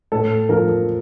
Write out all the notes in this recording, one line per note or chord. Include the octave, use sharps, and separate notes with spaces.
A2 A4
F3 A#4